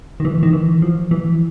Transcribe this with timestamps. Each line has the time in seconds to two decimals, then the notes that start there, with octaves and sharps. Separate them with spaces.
0.20 D#3
0.25 E3
0.43 D#3
0.53 E3
0.82 F3
1.11 E3